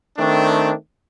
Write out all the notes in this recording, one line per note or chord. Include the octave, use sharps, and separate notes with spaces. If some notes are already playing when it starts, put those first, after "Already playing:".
D#3 A3 C4 D4